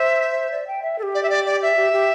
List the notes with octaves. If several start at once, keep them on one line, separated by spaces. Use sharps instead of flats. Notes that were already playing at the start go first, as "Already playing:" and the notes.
Already playing: C5 E5
D5
G5
E5
A4
G4
D5
E5
D5
D5
E5
G4
G4